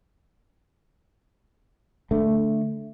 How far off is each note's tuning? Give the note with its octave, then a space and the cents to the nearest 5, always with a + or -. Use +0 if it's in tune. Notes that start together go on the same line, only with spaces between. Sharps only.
D3 +0 A3 +0